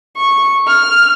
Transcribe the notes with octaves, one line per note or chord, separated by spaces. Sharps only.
C#6
F6